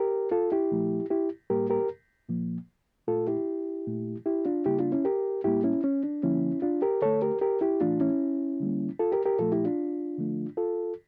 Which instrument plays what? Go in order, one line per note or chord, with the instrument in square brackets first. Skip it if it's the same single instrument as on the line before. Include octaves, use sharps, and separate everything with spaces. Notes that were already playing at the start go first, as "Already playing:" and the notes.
Already playing: [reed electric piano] G4 A#4
F4 A4
E4 G4
A#2 F3 A3
E4 G4
A2 G3 A#3 G4 A#4
G4 A#4
A#2 F3 A#3
A#2 A3 F4 A4
E4 G4
A#2 A3
E4 G4
D4 F4
C#3 G3 A#3 E4 G4
D4 F4
C#4 E4
G4 A#4
A2 G3 A#3 E4 G4
C#4 E4
C#4
D4
D3 F3 A#3 C#4 E4
D4 F4
G4 A#4
D3 A3 A4 C#5
G4 A#4
G4 A#4
E4 G4
A2 E3 A3 D4 F4
C#4 E4
D3 G3 A#3
F4 A4
G4 A#4
G4 A#4
A#2 F3 A3 F4 A4
E4 G4
D4 F4
D3 F3 A3
F4 A4